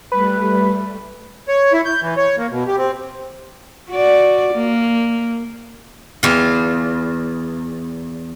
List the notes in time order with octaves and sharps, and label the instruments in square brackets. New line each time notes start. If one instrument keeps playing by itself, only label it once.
[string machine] G3 A3 [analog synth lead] B4
[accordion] C#5
E4
G6
E3
C#5
A#3
B2
G4
C4
[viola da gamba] F#4 D5
A#3
[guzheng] E2 F4